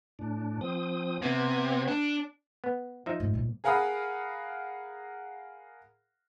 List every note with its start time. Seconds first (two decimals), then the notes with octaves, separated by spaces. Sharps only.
0.19 A2 D4
0.61 F3 C4 D#6
1.22 C3 B3 G#6
1.88 D4
2.64 B3
3.06 F3 D#4 E5
3.20 G#2
3.33 A#2 G3
3.64 G#4 A#4 F5 F#5 B5 D#6